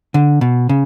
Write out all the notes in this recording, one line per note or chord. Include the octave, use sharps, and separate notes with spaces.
D3
B2
C#3